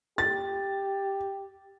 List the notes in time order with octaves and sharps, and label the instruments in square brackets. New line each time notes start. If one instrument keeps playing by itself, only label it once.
[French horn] G4 [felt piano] A6